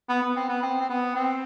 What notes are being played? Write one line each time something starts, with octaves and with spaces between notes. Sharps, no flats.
B3
B3
C4
B3
C4
C4
B3
C4